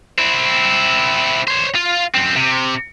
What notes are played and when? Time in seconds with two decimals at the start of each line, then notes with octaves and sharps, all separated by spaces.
0.19 C4 E4
1.48 C5 C#5
1.75 F4
2.15 F#2 C4
2.36 C3